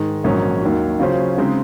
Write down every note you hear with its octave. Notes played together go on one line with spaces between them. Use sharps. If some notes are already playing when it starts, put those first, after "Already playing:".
Already playing: G#2 D#3 G#3
A#1 G#2 D#3 F#3 C#4
D#2 D#3 F#3
C#3 F#3 C#4 F4 C5
C#3 G#3 C4 D#4